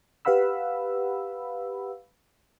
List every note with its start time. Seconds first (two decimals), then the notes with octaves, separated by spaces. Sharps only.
0.25 G4 B4 F5 F#5 B5 E6